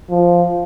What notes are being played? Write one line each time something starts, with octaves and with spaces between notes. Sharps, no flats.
F3